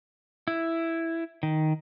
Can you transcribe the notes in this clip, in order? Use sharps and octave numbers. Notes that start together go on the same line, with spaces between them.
E4
D#3